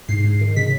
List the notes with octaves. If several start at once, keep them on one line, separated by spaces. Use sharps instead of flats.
G#2 C7
G#2
D#3
C#3 B6